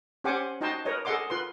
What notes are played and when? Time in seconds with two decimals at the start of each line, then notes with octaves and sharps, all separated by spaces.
0.24 C#4 G4 C5 F#5 G#5 D6
0.61 D#4 F#4 D#5 G5 A5 C6
0.85 A#4 B4 C#5 D#5
1.05 G#4 A4 D#5 F#5 C6 D6
1.30 F4 B4 C6